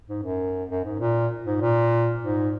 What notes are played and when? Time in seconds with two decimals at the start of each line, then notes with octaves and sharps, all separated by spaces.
0.08 G#2
0.23 F#2
0.70 F#2
0.85 G#2
0.99 A#2
1.46 G#2
1.61 A#2
2.22 G#2